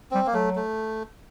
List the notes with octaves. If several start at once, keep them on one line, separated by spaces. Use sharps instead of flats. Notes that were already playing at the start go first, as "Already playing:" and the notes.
G3 C4
A#3
F#3 A3
A3